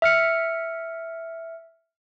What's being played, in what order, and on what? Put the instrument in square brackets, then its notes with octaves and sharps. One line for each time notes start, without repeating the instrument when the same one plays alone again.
[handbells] E5 F6 C#7